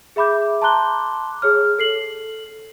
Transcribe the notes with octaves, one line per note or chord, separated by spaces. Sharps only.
G#4 E5 B5 D6 G6
A5 A#5 C6 D6 F#6 G7
G#4 C#5 F6
A4 C7 F#7